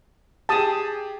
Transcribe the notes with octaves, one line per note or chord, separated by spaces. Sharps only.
G4 G#4 A5 D#6